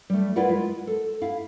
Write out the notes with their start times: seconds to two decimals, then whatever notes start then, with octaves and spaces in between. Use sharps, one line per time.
0.10 G3 A3
0.36 E4 F4 A#4 B4 D5 F#5
0.50 G#3
0.87 A4
1.22 E4 F5